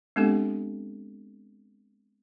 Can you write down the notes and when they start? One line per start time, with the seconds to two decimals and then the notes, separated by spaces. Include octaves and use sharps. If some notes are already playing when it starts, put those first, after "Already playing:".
0.16 G#3 B3 C4 D4 G4 A4